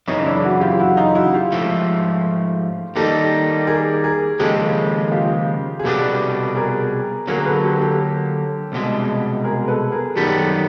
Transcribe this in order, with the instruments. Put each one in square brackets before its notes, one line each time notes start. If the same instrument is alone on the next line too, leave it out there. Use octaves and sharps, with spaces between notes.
[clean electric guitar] F#2 C#3 E3 [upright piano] C#4 D#4
[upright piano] D4 E4
E4 F#4
F4 G4
E4 F#4
D#4 F4
E4 F#4
F4 G4
[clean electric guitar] G#2 F3 A3
[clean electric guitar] D#3 G3 A#3 D#4 [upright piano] G4 A4
[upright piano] G#4 A#4
G#4 A#4
[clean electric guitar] D#2 C#3 F3 G#3 [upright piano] G4 A4
[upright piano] F4 G4
G#4
[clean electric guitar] C2 B2 G3 B3 D4 [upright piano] G4 A4
[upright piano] G#4 A#4
[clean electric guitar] D3 F#3 A#3 [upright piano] G#4 A#4
[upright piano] A4 B4
G4 A4
G4 A4
[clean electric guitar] C2 B2 G#3
[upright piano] G#4 A#4
A4 B4
G#4 A#4
[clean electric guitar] F#2 D#3 G3 B3 [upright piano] G4 A4